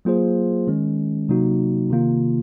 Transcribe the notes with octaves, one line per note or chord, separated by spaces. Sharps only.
F#3 A#3 F4 G#4 C5
D#3 G#3 C#4
C3 F#3 A#3 D#4 F#4
C3 D#3 A#3 F4